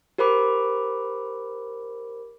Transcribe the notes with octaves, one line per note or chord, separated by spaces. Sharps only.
G4 A#4 C5 B5 D6